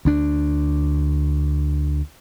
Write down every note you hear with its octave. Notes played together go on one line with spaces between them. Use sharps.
D2 D4